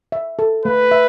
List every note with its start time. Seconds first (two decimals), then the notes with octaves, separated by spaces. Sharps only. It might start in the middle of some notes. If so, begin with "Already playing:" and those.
0.12 E5
0.39 A4
0.65 A3 B4
0.91 E5